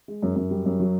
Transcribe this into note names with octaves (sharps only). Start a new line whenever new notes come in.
G#3
F#2
F#2
G3
F#2
F#3